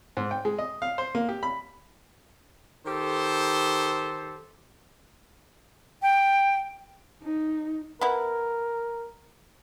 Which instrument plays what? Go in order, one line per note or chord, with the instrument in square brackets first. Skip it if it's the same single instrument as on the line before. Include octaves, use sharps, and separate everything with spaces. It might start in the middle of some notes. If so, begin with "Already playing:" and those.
[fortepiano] G#2
G5
G#3
D#5
F5
C5
A#3
G4
B5
[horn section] D#3 G4 A4 C5
[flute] G5
[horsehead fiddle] D#4
[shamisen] B3 E4 [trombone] A#4